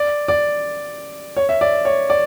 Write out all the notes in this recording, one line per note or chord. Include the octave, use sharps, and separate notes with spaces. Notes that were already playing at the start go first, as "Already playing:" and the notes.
Already playing: D5
D5
C#5
E5
D5
C#5
D5